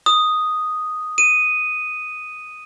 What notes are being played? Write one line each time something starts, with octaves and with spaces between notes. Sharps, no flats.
D#6
D#7